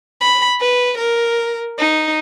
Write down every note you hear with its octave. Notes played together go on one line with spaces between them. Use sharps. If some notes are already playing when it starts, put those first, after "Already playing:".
B5
B4
A#4
D#4